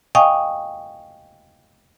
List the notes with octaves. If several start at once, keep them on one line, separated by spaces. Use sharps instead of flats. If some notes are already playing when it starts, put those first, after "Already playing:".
D#5 F5 G5 G#5 C#6 D#6